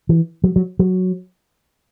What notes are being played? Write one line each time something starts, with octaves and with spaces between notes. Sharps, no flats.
E3
F#3
F#3
F#3